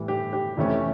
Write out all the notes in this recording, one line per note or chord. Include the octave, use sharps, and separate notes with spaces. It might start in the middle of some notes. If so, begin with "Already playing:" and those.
Already playing: A2 E3 G3
G4
G4
F2 C3 E3 A3 C#4